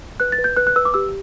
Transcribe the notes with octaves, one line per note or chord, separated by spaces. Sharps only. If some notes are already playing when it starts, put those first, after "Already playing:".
B4 F#6
A6
B4
G6
B4 F#6
F#6
B4 E6
D6
G4 E6